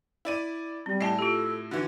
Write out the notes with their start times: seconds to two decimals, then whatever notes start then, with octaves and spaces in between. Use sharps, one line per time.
0.25 E4 D5 D#7
0.86 G3 C4
1.01 A2 D#5 G#5 A5
1.19 F4 G4 A4
1.71 D3 E3 F#4